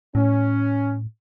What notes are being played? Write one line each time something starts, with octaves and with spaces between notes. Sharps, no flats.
A2 C#4